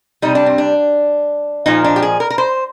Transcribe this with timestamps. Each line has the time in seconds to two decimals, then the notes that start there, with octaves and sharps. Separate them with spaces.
0.22 C3 G3 D#4
0.35 D4
0.46 C4
0.58 D4
1.66 A#2 F3 G#3 D#4
1.84 D4
1.96 G4
2.02 G#4
2.20 A#4
2.30 A#4
2.38 C5